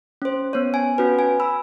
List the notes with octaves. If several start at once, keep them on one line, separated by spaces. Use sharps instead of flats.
C#4 C5
B3 C#4 C#5
G#5
C#4 F#4 B4
G#5
B5 E6